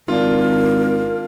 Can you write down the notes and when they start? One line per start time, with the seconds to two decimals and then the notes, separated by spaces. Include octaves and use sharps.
0.08 G#1 D4 F4 A#4